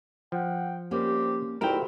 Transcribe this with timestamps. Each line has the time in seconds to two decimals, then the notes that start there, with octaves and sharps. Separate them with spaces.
0.32 F3 F#5 G5
0.91 G3 A#3 C4 C#4 G4
1.61 D2 A#2 D#4 E4 G4 A#4 G5